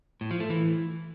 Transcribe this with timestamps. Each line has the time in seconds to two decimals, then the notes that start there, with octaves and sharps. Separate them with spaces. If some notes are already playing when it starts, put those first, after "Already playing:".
0.21 A2
0.31 F3
0.40 A3
0.50 E3